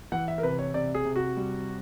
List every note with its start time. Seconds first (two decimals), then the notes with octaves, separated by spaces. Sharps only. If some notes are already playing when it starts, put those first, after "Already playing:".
0.12 E3 F#5
0.28 E5
0.38 A#4
0.43 C3 B4
0.59 C#5
0.74 C3 D5
0.95 G#4
1.05 C3
1.16 F#4
1.37 G3